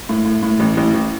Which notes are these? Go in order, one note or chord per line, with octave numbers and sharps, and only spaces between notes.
A2
A2
A2
A1
A1
A1